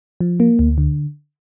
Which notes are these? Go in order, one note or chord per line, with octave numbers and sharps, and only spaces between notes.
F3
A#3
D2
D3